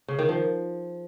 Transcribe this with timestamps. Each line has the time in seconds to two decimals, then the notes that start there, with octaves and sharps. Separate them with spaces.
0.08 C#3
0.19 D#3
0.29 F3